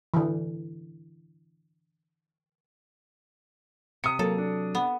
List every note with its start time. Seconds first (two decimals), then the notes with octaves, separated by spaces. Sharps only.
0.14 D3 E3
4.04 C3 D#6 C#7
4.19 F#3 A#3 A4
4.38 D4
4.75 B3